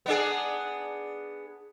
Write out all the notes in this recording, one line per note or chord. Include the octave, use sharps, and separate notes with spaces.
B3 D4 G#4